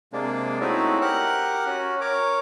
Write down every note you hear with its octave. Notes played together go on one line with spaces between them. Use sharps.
C3 G#3 A#3 D4
A3 C4 C#4 D#4 E4 F#4
G4 A#4 F#5 F#6
C#4 F#4
A#4 C#5 D6